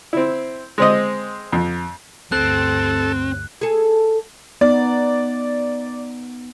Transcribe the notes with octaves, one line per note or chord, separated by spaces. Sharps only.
C4 E4
G#3 C4 D#5
F2
D2 G2 C4 A4 F#6
G#4 A4
B3 D#4 D5